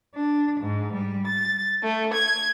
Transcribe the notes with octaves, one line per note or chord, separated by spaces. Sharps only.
D4
G#2
G3
A6
A3
G#6